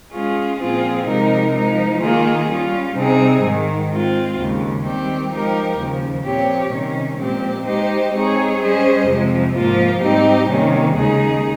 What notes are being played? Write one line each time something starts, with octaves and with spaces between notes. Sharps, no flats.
G#3 C#4 F4 G#4
A#2 F3 C4 F4 G#4
C3 F3 G#3 D#4 A#4
F3 G#3 D#4
D#3 A#3 F4 G#4
G3 C#4 F4
C3 G3 C4 D#4 G#4
G#2 D#3 G#3
G#3 C4 F4
D#2 C#3 G#3
D#3 G3 C4 G4
F3 G#3 D#4 G4 A#4
D#2 C#3 F3
A#2 F3 C4 G4 C#5
C3 D#3 G3 C#4
A#2 F3 G#3 C4 G4
G#3 D#4 G4 C5 D#5
G#3 C4 D#4 G#4 C#5
G3 C#4 G#4 C5 D#5
F2 C3 F3 G#3
G#2 F3 A#3 F4
G#2 G3 C4 D#4 G4
C3 D#3 G3 A#3 C#4
D#2 C#3 G#3 D#4 G#4